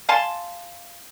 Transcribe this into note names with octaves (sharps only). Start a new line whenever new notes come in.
F5 G#5 A5 C6